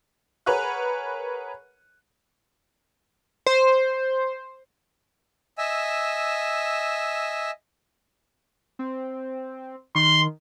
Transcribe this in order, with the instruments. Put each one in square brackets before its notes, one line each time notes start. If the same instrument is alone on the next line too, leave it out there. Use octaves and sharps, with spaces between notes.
[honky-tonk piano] G#4 A#4 B4 C#5 F#5 F#6
[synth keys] C5
[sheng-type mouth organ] D#5 E5 G#5 E6
[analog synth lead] C4
[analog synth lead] D#3 [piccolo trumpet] C6